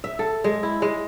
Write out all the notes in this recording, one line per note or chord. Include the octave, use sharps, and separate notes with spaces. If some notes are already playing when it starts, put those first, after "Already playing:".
E5
A4
G#3
E4
G#3